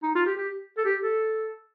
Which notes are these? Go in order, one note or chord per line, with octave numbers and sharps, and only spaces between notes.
D#4
F4
G4
G4
A4
G4
A4